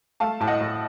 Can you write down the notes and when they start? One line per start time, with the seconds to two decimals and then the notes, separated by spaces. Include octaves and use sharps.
0.20 A3 F5 A5
0.40 A2 A5
0.47 D#5 F#5
0.61 A2